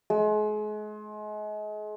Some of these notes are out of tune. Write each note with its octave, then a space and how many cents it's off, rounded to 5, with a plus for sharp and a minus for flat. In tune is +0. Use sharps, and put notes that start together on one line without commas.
G#3 +35